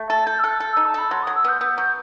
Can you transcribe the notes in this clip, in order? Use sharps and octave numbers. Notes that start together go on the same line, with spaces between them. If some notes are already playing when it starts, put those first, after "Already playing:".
Already playing: A3
A4 A6
A4 G6
E6
A4 F#6
A4
D#4 E6
A5
A4 B5
F#3 C6
F#3 D#6
E6
B3 G6
B3 G6
F#3 G6